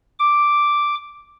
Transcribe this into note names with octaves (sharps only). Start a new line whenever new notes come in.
D6